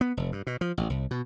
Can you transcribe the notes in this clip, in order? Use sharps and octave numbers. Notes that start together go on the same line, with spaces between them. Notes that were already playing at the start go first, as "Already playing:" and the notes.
B3
F1
G2
B2
F3
A1
C2
B2